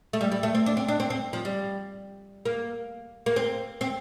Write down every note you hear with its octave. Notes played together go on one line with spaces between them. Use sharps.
A3
G3
G3
A3
C4
D4
C4
D4
C4
C4
F3
G3
A#3
A#3
C4
C4